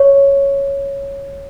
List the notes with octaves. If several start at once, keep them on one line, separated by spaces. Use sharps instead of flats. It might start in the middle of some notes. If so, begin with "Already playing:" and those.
Already playing: C#5